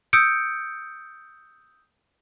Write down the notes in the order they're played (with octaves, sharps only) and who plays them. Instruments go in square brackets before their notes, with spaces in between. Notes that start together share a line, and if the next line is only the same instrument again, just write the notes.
[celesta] D#6 E6 G6 C#7 D7